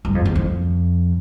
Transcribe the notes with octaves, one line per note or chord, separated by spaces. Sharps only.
G2
F2
E2
F2